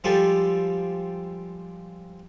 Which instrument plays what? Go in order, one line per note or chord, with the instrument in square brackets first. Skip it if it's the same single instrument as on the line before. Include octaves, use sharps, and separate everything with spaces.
[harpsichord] F3 G3 G#3 F4 G4 A4